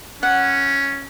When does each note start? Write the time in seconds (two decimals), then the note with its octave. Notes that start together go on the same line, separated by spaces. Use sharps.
0.23 C#4 F#5